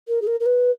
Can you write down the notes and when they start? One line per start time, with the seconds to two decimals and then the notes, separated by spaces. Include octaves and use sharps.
0.08 A#4
0.22 G#4
0.27 A#4
0.40 A#4
0.46 B4